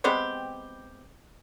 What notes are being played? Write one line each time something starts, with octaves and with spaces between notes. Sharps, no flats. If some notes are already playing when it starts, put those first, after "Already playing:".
G#3 B3 C4 G4